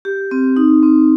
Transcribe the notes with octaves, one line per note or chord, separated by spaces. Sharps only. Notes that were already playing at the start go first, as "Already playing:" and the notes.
G4
C4
D#4
C4